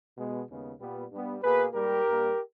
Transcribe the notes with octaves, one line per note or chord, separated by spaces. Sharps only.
B2 G#3 B3
D#2 C#3 G#3 B3
A#2 G3 B3
G2 G3 B3
B2 A#3 G#4 B4
G#2 G3 A#3 G4 A#4
G2 G3 A#3